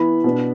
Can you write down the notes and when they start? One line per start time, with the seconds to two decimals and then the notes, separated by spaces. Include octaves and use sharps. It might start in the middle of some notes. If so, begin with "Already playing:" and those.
Already playing: E3 B3 E4 B5
0.24 B2 B3 D4